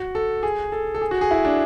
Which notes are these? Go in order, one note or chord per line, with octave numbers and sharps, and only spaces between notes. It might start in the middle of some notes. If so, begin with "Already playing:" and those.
Already playing: F#4
A4
G#4
A4
A4
G#4
F#4
G#4
E4
D4